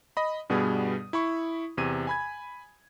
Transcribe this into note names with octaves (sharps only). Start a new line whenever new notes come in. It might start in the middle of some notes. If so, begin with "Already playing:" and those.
D#5 B5
G2 B2 G3 B3 G#4 D#6
E4 B5 C#6
E2 C3 G#6 D#7
G#5 B5 G#6